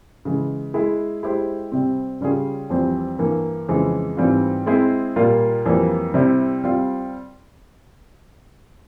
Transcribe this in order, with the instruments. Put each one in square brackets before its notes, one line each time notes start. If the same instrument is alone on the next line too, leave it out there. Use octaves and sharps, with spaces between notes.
[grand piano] C#3 E3 G#3
G#3 E4 G#4
G#3 E4 G4 C5
C3 G3 C4
C#3 G3 C#4 F4 G#4
F2 E3 G3 C4
G2 E3 A#3
F2 C#3 E3 G#3
G#2 E3 G3 C4 F4
G#3 C4 E4 G#4
A#2 G3 A#3 F4
F2 E3 G3 A#3
C3 G3 C4 E4
G3 C4 F4